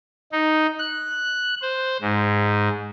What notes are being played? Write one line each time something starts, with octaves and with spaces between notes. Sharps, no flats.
D#4
F#6
C5
G#2